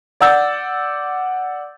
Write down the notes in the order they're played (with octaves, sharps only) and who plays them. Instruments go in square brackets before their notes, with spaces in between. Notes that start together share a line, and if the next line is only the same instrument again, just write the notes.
[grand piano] D5 F#5 E6 G6 A6